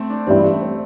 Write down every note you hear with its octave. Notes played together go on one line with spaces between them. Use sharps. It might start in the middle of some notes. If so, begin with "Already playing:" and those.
Already playing: A3 C4 C5
D4
A1 G2 G3 C4 E4 G4
A3
C4